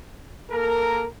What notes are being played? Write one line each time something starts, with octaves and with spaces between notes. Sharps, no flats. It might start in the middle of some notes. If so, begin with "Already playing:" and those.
A#3 A4 A#4